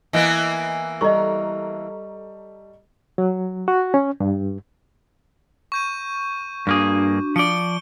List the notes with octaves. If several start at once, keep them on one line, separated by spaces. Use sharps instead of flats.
E3 A#3 B3 D#5 F#6
G3 A4 D#5 A#5 C#6
F#3
F#4
C#4
G2
C#6 G6 D#7
G2 A#3 D4 F#4 G#4
F3 D5 C#7 D7 G7